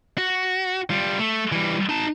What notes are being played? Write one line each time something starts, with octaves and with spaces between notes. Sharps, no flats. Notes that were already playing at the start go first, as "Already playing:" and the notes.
F#4
G3 F4
A3
E3 G3
D#4 A5